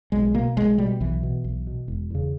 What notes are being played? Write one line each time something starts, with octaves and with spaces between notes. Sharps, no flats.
B1 G#3
B2 A#3
B1 G#3
B2 G3
B1 E3
B2
B1
B2
E1
E2 C#3